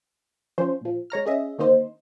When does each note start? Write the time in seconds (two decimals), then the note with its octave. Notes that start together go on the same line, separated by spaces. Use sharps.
0.58 F3 C#4 C5
0.81 A#1 F3
1.10 G#3 C#5 A#5 F6
1.26 C#4 G#4 D#5 E5
1.58 D3 D#3 A#3 C4 D#4 C5